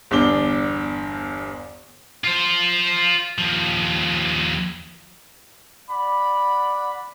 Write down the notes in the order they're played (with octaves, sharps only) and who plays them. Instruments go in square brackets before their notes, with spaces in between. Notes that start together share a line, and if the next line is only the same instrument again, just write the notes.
[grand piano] G1 E2 D4 G7
[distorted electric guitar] F4 C5
D#2 F3
[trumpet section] D5 F#5 B5